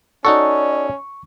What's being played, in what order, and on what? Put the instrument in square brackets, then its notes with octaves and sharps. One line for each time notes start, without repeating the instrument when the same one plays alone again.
[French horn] C#4 [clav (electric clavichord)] D#4 F#4 A4 [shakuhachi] D5 [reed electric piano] C#6